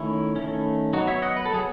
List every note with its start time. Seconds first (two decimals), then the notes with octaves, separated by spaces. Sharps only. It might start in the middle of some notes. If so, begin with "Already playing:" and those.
Already playing: D#3 A3 C#4 E4
0.36 D#3 A3 C#4
0.93 F#3 B3 D#4 F#4
1.07 C#5 E5
1.22 D#5 F#5
1.37 B4
1.46 A4
1.50 F#3 B3 G#4